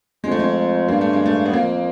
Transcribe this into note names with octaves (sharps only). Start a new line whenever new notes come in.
F2 G#3
A3
G#3
G2 A#3
A3
G#3
A3
B3
F2 A#3